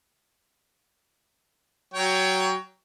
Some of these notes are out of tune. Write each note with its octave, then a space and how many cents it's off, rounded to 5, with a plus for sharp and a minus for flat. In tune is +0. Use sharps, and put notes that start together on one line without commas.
F#3 +15 C#5 +20 G5 +0